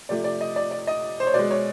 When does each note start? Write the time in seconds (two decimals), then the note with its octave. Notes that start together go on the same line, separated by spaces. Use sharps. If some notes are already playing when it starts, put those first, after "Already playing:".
0.09 C3 F3 A3 D5
0.24 D5
0.41 D#5
0.56 D5
0.71 D5
0.87 D#5
1.20 C5
1.27 C#5
1.34 B2 G#3 D5
1.51 C#5